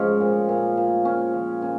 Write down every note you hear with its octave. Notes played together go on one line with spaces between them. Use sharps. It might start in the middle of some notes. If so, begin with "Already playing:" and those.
Already playing: G#2 F3 C#4
A#2
A#2
A#2
A#2 C#4
F3
A#2 C#4